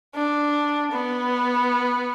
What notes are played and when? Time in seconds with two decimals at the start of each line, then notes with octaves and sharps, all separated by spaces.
0.15 D4
0.92 B3